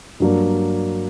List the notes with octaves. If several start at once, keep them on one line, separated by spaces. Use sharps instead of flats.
G2 F#3 A#3 D4